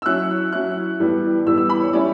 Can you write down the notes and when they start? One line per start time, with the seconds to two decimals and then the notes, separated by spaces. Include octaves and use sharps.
0.02 E6
0.06 F#3 C#4 E4 F#6
0.52 F#3 C#4 E4 F#6
1.00 A2 E3 G3 B3
1.46 A2 E3 G3 B3 E6
1.58 E6
1.70 B5
1.81 C#5
1.93 E3 G3 C#4 E4 D5